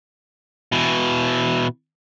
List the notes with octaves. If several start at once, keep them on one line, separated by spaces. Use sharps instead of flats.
B2 E3